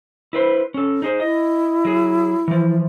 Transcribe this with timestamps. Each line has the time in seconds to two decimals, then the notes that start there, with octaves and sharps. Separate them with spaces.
0.33 E4 B4 C5
0.74 C#4 A4
1.02 D#4 G#4 C5
1.20 E4 D#5
1.85 F#3 G#4
2.48 E3 F3